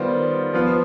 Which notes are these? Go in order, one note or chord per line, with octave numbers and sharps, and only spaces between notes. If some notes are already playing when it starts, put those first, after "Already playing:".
Already playing: D#3 G3 B3 F4 C5
F3 B3 F4